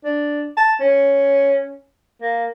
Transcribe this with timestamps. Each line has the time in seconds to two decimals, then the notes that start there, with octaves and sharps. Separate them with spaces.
0.04 D4
0.57 A5
0.80 C#4
2.22 A#3